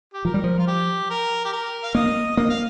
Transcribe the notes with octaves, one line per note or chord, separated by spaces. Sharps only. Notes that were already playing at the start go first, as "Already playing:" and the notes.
G4
F3 A#4
G3
F3
F4
G4
A#4
G4
A#4
F5
A#3 D#5
A#3 D#5
F5